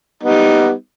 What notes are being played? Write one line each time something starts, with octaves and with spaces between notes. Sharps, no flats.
G3 B3 D#4